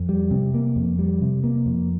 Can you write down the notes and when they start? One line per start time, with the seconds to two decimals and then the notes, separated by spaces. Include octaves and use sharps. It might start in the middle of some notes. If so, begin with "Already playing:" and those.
Already playing: F2
0.09 G3
0.31 C3
0.54 A#3
0.76 F2
0.99 G3
1.22 C3
1.44 A#3
1.66 F2